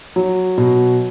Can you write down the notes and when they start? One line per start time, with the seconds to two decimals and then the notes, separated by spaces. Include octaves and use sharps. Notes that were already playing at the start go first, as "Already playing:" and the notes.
0.16 F#3
0.58 B2